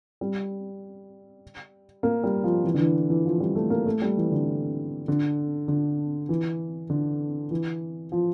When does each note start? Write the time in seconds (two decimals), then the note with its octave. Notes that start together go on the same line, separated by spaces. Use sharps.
0.21 G3
2.03 A#3
2.24 G3
2.44 F3
2.64 E3
2.74 D3
2.80 E3
3.10 E3
3.26 F3
3.40 G3
3.55 A3
3.70 A#3
3.86 A3
4.02 G3
4.17 E3
4.32 D3
5.08 D3
5.68 D3
6.29 E3
6.90 D3
7.51 E3
8.12 F3